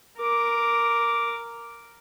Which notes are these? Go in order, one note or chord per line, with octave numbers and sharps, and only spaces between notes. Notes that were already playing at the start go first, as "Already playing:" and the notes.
A#4 D6